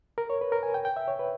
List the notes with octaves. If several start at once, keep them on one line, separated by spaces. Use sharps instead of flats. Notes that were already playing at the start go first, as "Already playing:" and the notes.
A#4
C#5
B4
A#4
G#5
G5
G5
E5
C#5
B4